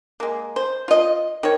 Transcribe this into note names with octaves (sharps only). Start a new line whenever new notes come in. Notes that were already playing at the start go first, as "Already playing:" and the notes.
G#3 A#3
C5
F4 D#5
D#3 C#5